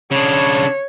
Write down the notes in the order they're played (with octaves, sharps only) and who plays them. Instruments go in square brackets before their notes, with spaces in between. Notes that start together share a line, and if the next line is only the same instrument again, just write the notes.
[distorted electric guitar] C#3 D4 [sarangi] C#5